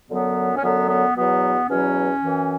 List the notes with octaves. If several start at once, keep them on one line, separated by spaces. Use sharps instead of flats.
F#2 D3 F#3 B3
C#4
F#2 D3 F#3 B3
B3
E2 B2 F#3 B3
E2 B2 F#3 C#4
F#2 E3